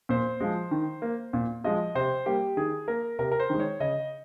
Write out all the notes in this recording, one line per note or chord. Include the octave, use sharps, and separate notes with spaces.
A#2 C5
F3 G#3
D#3
A#3
A#2
F3 G#3 D#5
C3 C5
G3 A#3 G4
D#3 G#4
A#3 A#4
C3 A#4
A#4
C5
D#3 G#3
C#5
C#3 D#5